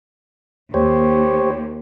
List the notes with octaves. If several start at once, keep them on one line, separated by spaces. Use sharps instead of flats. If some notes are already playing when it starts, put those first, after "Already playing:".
D#2 G4 C5 C#5